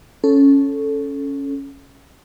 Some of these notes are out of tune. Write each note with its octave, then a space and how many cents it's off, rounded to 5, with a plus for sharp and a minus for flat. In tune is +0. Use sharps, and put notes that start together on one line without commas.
C#4 +0 A4 -5